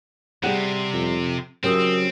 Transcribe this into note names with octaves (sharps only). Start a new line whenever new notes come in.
C3 G3 G#4 F#5
F2
C#3 F#3 C4 C#4 G4 A#4 D#6 E6